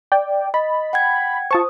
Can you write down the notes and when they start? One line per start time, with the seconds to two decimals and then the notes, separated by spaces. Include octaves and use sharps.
0.12 D5 G5
0.54 D#5 B5
0.93 F#5 G5 G#6
1.51 F4 C5 A5 C#6 D#6